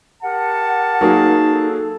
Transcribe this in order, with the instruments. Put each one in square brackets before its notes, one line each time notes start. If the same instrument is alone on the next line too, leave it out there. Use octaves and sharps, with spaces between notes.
[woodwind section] G4 A#4 F#5 [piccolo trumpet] A5
[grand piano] F#3 A#3 G#4 [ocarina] D#4
[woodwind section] A4